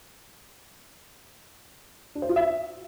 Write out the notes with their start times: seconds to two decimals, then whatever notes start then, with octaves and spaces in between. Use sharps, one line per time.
2.15 D4
2.22 C5
2.29 F4
2.36 E5